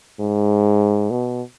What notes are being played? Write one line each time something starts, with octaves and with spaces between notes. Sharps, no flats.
G#2
B2